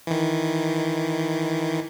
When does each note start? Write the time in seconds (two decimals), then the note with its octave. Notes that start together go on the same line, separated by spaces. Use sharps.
0.07 D#3 E3